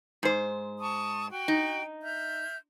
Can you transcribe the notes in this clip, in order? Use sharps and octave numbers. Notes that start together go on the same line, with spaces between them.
G#2 C5
A5 C#6 D#6
F#4 G5
D#4
E5 F6 G6